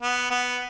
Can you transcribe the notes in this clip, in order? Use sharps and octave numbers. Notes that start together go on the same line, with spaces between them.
B3
B3